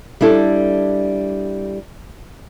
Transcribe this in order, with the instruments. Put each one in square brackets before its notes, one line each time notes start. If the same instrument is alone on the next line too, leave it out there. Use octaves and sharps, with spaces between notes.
[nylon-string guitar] G3 D4 E4 A4